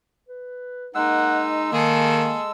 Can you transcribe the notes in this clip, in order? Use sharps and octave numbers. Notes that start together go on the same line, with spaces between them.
B4
G#3 A#3 D#4 F#5 E6
D#3 A#3 G#4 A4